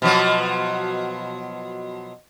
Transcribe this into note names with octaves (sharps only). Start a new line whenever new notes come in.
B2 F3 F#3